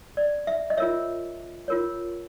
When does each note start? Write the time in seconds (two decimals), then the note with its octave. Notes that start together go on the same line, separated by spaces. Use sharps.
0.17 D5
0.47 E5
0.70 D#5
0.77 F4 A#4 C#5 E5
1.68 F4 A#4 C#5